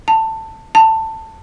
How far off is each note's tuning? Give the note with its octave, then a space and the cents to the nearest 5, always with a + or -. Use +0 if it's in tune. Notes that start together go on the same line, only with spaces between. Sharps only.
A5 +15
A5 +15